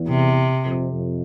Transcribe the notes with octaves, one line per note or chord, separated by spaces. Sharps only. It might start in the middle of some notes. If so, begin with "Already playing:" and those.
Already playing: E2
C3
F2
F2